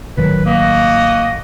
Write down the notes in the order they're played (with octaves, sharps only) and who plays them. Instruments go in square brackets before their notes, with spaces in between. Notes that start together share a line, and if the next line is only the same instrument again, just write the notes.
[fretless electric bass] A1 D#3 F#3 [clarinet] B4
[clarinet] A#3 [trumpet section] F#4 D#5